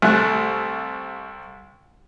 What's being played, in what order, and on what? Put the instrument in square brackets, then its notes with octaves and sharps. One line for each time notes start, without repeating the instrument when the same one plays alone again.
[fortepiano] C2 A3 F#6